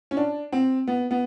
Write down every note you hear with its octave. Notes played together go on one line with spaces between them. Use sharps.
C#4
D4
C4
B3
B3